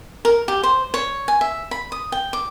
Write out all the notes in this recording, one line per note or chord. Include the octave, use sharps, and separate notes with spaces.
A#4
G4
C5
C#5
G#5
E5
B5
D#6
G5
D6